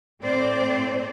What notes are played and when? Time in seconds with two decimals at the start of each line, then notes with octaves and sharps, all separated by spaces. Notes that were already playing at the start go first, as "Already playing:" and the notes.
0.22 A2 C4 C5 D5